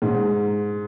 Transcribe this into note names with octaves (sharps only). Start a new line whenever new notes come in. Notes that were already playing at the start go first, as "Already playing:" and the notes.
G#2